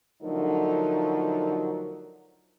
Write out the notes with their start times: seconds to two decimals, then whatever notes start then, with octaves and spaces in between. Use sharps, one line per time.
0.22 D3 F3 F#3 A3 D#4 A#4